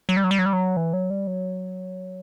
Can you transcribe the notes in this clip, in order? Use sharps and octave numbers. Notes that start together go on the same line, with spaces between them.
F#3
G3
F#3
G3
F#3
G3
F#3
E3
F#3
G3
F#3